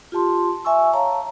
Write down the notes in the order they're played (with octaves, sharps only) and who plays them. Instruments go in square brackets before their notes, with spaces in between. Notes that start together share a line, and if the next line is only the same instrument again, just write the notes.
[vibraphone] F4 G4 A5 C6
E5 G#5 C#6 E6
C#5 F5 A5 A#5